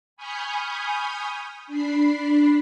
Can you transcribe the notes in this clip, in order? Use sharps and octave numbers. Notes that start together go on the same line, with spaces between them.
G#5 B5 C#6 D#6 F6 G6
D4 B5 C7